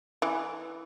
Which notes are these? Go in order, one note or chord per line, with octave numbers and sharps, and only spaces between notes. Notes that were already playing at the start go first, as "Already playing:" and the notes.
E3